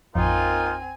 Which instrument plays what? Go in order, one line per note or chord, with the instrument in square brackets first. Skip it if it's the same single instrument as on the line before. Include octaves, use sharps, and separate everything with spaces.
[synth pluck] A1 F2 [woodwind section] A#3 D#4 F4 [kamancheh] C4 G#5